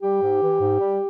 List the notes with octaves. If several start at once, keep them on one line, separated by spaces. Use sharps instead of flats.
G3 G4
G#2
E3
G#2
G3